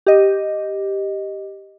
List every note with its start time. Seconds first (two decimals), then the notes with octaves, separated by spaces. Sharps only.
0.07 G4 D#5